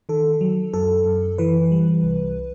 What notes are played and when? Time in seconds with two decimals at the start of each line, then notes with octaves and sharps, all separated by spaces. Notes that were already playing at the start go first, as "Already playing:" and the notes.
0.09 D#3 A4
0.41 F#3
0.74 F#2 A4
1.06 F#2
1.38 E3 B4
1.72 G3
2.04 C2